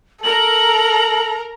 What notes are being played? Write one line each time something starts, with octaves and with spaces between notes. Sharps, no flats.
A4 A#4 A#5 F#7